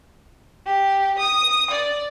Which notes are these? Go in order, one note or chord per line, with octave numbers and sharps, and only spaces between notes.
G4
D#6
D5